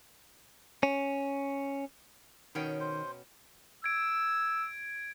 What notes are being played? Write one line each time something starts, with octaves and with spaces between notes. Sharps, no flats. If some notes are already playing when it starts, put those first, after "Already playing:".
C#4
B2 D#3 C#4 G5
C5
E6 G#6 D7